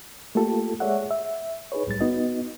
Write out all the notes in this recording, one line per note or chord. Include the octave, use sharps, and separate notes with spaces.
A3 A#3 F4 G4 A4
G#3 G#4 C#5 D5 E5 F#5
E5
D#4 G#4 B4 C#5
C2 A2 G3 A6
B3 D#4 F#4 D#5